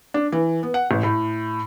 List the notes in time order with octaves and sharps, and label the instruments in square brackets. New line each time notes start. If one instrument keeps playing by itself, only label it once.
[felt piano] D4
E3
B3
F#5
A1
A2